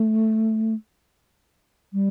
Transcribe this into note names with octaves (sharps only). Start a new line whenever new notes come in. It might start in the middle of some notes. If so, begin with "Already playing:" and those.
Already playing: A3
G3